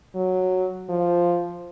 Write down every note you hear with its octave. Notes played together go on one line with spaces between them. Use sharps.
F#3
F3